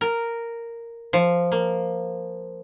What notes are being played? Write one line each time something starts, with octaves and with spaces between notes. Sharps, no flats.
A#4
F3
A#3